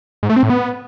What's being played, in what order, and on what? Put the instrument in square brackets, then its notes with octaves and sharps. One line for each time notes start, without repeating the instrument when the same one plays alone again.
[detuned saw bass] G#2
A3
C4
A2
B3